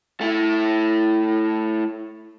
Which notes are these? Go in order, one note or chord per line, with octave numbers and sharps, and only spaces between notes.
A3 E4